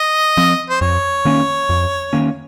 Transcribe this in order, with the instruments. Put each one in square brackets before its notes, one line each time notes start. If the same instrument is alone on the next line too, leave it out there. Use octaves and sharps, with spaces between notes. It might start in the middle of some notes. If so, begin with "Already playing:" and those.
Already playing: [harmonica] D#5
[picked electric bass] F3 C4
[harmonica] C5
[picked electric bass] F2 [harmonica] C#5
[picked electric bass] D#3 A#3 C#4
F2
D#3 A#3 C#4